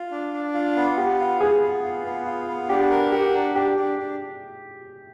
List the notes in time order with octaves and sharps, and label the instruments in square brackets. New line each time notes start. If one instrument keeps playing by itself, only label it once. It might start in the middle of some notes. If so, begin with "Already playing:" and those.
Already playing: [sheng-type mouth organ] F4
D4
D4
F4
B3
[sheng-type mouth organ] B3 [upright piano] G4
[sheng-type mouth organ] F4
[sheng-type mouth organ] B3 [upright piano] G#4
[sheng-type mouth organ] B3
F4
B3
F4
B3
[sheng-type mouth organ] D4 [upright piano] G4
[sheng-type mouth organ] A#4
[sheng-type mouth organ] F#4 [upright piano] G4
[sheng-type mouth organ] D4
[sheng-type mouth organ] D4 [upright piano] G4
[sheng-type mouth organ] D4
D4